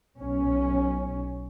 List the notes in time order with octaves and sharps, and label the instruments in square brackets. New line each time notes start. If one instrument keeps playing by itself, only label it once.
[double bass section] B1 C#4